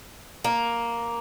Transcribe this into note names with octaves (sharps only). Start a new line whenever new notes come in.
A#3